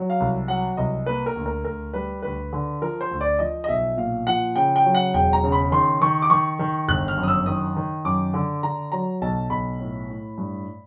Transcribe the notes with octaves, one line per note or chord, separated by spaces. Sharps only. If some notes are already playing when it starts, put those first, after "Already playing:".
Already playing: F#3
F5
C2
F#3 F#5
C2 D#5
A#3 B4
A#4
D2
A#4
D2 A#4
G3 B4
D2 B4
D3
F3 A#4
C5
D2
D5
F3 D#5
D#5
B1 E5
A#2 F5
F3 F#5
C#3 G5
G5
F#3
F#5
E1 G5
A#5
C#3
B5
D#3 C6
D#3 C#6
D6
D#3 C#6
D#3
G1 F#6
F6
F#2
D#6
E6
D#3 D#6
D#3
F#2 D6
D3
D3 A#5
F#3 A#5
B1 A5
B1 B5
A2
A2
G2